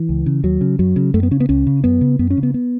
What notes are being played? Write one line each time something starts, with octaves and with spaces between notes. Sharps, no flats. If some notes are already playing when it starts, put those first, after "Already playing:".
Already playing: E3
C#2
C#3
D#2 F#3
C#3
F#2 F#3
C#3
F#2 A3
B3
C#3 C#4
B3
C#2 C#4
C#3
F#2 B3
C#3
F#2 B3
C#4
C#3
B3
B3